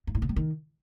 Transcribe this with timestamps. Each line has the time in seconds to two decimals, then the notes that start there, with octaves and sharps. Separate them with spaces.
0.07 G2
0.15 A2
0.22 B2
0.29 G3
0.36 D#3